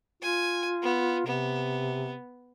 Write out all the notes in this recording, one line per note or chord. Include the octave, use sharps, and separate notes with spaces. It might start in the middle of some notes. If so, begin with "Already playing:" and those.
F4 G#5
B3
C3 B3